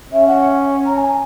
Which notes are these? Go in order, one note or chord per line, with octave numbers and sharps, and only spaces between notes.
C#4 E5
F#5
A#5
G#5